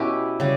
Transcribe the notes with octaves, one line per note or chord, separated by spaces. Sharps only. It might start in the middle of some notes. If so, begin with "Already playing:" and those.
Already playing: B2 B3 C#4 E4 G4
C#3 G3